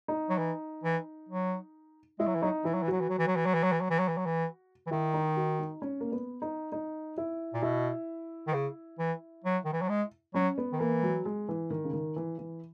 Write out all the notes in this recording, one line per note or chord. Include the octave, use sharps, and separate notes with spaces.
D#4
F#3
E3
E3
F#3
G#3 E4
F#3
E3
F#3 D#4
E3 E4
F#3
E3
F#3 F#4
E3
F#3
E3
F#3
E3
F#3
E3
F#3
E3
F#3
E3
F#3
E3
F#3
E3
E3
D#3 E4
D#4
F#4
D#4
C#4
A#3
B3
D#4
D#4
E4
A#2
B2 E4
D#3
C#3
E3
F#3
D#3
E3
F#3
G#3
F#3 C#4
B3
D#3
E3 A#3
F#3
G#3
E3
D#3
C#3
D#3
E3
E3